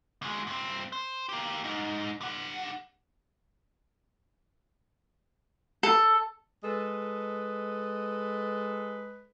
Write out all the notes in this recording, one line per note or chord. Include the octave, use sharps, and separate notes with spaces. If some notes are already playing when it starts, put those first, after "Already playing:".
D2 G#3
G2 C4
C5
A#3 G4
G#2 D#4
G3 F#5
A4
G#3 A4 B4 D#5